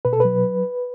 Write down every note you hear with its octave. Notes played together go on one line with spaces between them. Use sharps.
B2 B4
A4
F#3 B4